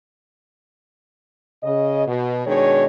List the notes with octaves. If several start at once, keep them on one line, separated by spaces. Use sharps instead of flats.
C#3 D#5
B2
B2 D#3 G#3 D4 C#5